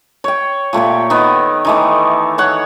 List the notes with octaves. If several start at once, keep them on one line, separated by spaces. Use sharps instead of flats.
C#5 G5
A#2 A3 G4 C#5
D#3 B3
D#3 E3 A3
C#5 F#5